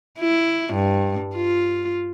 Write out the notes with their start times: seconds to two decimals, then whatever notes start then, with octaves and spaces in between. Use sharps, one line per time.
0.20 E4
0.74 G2
1.35 F4